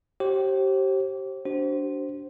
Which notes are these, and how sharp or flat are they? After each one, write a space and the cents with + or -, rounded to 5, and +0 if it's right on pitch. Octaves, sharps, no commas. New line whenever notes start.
G4 -25 C5 +35
D4 -15 F#4 +40 C5 +0